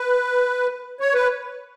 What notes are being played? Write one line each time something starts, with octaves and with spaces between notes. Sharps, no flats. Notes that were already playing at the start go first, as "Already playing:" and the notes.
Already playing: B4
C#5
B4